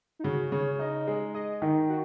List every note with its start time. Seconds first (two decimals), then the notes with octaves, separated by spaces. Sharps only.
0.19 D#4
0.24 C#3 F#4
0.52 C#3 C#5
0.79 D#4 D#5
1.07 G#3
1.34 G#4 D#5
1.62 D#3 D#4
1.89 F#4